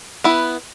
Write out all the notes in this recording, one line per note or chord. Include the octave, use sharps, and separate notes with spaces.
B3 E4 B4